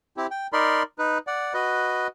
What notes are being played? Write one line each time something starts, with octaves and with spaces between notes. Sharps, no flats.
C4 E4 G4
G5
D#4 A#4 D5 B5 C6
D#4 B4
D5 F#5
F#4 B4 D#5